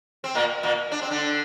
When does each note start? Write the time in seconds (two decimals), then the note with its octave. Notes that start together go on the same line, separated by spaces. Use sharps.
0.24 C4
0.35 A#2 A#3
0.63 A#2 A#3
0.92 D4
1.02 C4
1.11 D3 D4